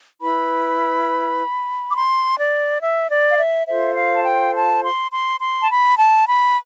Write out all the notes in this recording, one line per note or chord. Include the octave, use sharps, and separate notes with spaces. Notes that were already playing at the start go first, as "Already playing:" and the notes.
E4 B4 B5
D6
C6
D5
E5
D5
F5
E5
F4 A4 C5 E5
F5
A5
G5
A5
C6
C6
C6
A5
B5
A5
B5